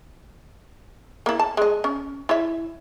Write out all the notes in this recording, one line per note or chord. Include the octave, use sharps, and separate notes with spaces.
A#3 E4
A5
G#3 D#5
C#4
E4 C#5 E5